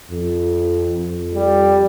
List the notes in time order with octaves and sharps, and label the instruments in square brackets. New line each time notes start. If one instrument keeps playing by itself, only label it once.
[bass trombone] F2
F2
[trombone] G3